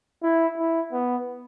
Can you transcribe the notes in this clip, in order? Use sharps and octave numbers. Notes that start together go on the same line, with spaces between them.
E4
E4
B3